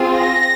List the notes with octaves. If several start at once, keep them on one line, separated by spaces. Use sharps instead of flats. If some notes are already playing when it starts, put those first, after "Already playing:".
Already playing: C4 F4 G#4
A#6